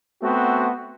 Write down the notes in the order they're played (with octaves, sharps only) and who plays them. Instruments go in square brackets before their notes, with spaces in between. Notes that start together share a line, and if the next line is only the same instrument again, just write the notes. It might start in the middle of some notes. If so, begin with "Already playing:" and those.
[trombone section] A3 B3 C4 F#4